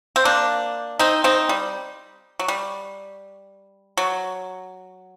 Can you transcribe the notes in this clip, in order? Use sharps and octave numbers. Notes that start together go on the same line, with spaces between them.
C4
A#3 D4
C4 D#4
C4 D#4
G3
F#3
G3
F#3